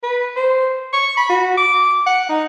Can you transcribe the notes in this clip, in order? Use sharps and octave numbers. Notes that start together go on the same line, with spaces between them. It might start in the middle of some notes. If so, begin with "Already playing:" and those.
B4
C5
C#6
B5
F#4
D6
F#5
D#4